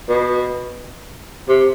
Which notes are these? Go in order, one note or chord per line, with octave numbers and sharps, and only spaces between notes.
B2
C3